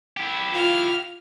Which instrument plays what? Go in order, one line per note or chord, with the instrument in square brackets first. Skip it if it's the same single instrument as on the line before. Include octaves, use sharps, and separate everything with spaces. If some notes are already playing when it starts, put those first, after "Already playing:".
[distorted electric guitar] E4 G4
[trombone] F4 [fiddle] F6